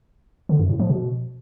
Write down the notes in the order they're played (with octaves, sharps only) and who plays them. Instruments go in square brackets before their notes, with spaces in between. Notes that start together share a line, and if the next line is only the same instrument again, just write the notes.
[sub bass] D3
F#2
A2
F3
B2